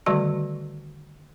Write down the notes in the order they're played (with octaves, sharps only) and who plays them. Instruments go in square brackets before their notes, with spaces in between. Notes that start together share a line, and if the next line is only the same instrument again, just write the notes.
[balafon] D3 D#3 G3 A3 F#4 D5